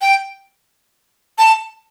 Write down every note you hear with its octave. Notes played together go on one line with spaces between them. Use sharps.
G5
A5